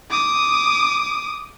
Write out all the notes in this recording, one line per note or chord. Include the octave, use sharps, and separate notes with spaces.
D6 D#6